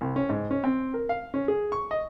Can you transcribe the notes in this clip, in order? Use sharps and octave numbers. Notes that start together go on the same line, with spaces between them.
C2
C#4
G#2
C#4
C4
A#4
F5
C#4
G#4
C#6
D#5